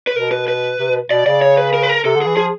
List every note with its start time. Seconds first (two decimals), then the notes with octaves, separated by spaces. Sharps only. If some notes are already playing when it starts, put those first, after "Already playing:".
0.07 B4
0.16 B2 A#4
0.31 B4
0.48 B4
0.79 C3
0.90 B2
1.11 B2 D5
1.26 C#3 D5
1.42 C#5
1.57 B4
1.74 A#4
1.82 B4
1.89 A#4
2.05 C3 A4
2.16 D3
2.22 E3 G#4
2.36 F3 G#4